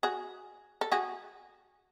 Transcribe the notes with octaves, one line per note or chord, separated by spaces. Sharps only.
F#4 G#4
A4
F#4 G#4